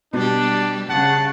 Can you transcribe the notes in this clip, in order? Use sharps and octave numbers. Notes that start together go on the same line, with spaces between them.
B2 G3 D4 G4
C#3 F#5 A5